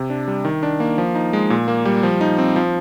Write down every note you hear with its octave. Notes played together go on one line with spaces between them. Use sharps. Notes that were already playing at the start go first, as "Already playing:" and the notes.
Already playing: C3
D4
G3
D#3
D4
A#3
F3
D#4
G#3
A#2
A#3
G3
F3
D#4
C4
F3